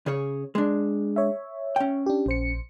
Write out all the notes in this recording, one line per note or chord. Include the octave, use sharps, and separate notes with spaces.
C#3 G#4 C#5
G#3 D4
C#5 E5
C#4 G5
D4 G4
A#1 C5 C#7